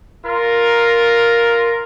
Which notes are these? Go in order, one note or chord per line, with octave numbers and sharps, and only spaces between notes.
F4 A#4